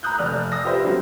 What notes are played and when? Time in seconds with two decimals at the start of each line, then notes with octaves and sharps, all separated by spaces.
0.03 A#5 B5 D#6 F#6 G6
0.19 F1 D5 F6
0.52 D#6 E6 A#6
0.64 F4 G4 B4 C5 D5 E5
0.84 D3 F#3 G3 C4